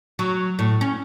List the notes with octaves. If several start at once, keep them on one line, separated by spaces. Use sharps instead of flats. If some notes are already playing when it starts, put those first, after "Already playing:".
F#3
A2
C#4